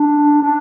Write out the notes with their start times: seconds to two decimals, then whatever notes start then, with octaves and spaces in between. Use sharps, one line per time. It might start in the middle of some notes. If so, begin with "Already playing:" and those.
Already playing: D4
0.43 D4